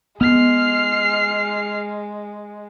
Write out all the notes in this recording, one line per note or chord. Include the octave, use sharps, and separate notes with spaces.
G#3 B3 F6 C7